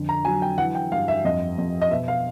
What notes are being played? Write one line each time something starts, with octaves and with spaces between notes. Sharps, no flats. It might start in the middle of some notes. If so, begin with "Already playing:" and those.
Already playing: F2 D3
A#5
F#3 G#5
G5
E3 F#5
G5
G2 F5
E5
F2 D#5
F2
D#5
B2 E5
F5